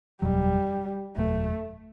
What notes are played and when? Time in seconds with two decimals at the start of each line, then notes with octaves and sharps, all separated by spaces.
0.22 F#1 E2 B2 F#3 G3
1.17 F#1 E2 B2 F#3 A3